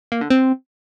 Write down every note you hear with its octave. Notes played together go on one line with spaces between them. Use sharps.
A#3
D3
C4